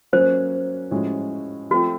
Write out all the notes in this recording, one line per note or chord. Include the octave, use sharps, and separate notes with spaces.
F#3 A#3 C#4 C5
A2 F3 G#3 C#4 F#4
F3 A3 C4 F4 F#4